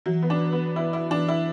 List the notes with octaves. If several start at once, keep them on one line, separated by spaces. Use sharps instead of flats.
E3 F#3
B3
D4
E3
B3
E3 E4
E4
E3 D4
E4